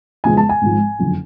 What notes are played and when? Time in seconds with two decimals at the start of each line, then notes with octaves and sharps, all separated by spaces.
0.24 E2 C#3 F3 G#3 B3 G#5
0.37 A5
0.49 G#5
0.62 G#1 G#2 F3
0.99 F#1 F2 D3